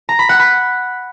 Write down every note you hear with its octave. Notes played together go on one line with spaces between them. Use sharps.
A#5
B5
F#5
B5